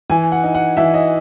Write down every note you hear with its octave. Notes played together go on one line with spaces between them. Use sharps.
E3 G#5
F#5
D#4
F#5
E3 E5
D#5